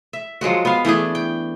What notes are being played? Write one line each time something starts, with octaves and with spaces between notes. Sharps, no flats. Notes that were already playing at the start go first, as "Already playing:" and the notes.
E5
F3 F#3 G#3 F#4
B3 F5
E3 A3 D4 G#4
G5